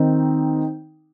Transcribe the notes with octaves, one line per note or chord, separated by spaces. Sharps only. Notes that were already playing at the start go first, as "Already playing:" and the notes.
Already playing: D#3 C4 D#4